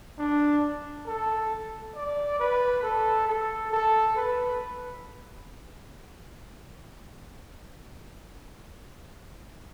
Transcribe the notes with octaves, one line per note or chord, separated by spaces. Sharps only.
D4
A4
D5
B4
A4
A4
A4
B4